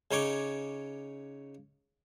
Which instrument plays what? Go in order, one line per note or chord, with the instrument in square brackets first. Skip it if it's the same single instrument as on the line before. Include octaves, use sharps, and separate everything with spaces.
[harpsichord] C#3 D#4 C#5 D6